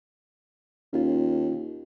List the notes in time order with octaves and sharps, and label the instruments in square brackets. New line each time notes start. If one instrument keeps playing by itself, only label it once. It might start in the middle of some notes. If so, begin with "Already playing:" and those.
[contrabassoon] D#2 [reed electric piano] C#4 F4